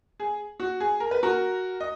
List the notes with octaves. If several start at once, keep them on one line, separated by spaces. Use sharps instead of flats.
G#4
F#4
G#4
A#4
B4
F#4 A#4
D#5